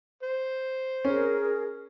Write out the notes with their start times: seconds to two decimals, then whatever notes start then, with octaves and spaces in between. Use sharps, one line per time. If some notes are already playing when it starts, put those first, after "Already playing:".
0.23 C5
1.05 C#4 G#4 A#4